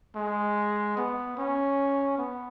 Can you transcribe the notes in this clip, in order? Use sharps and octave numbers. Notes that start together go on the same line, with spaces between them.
G#3
B3
C#4
B3